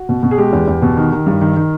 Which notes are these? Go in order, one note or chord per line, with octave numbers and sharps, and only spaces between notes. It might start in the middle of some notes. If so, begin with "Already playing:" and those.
Already playing: F#4
B2
B2
G#4
G#3 G4
E2
E2
B2
D#3
D#3
G2
D#3
D#3